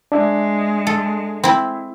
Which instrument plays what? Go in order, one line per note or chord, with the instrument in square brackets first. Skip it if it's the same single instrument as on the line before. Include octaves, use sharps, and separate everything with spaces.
[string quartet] G#3 [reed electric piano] D4 E5
[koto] A4
C4 E4